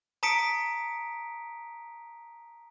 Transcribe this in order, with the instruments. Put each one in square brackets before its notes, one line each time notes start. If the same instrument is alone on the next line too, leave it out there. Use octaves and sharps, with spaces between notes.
[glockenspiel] A5 A#5 D#6 B6 C#7 D7